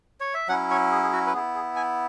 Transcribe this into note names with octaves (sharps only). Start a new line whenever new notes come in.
C#5
E5
F#3 C#4 E4 F#5
C#5
G#4
G#4
F#4
B4
B3 E4 G#4
G#4
G#5